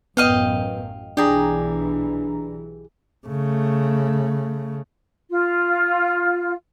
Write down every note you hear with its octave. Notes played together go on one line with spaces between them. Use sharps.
A1 F#2 B3 D#5 F5 G5
B1 E3 D4 G4 G#4 A#5
C#3 A3
F4